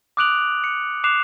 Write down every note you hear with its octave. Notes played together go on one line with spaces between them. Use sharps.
D6 D#6 F#6 D7 F7 F#7
C#7
D6 F#6 C7 E7 F7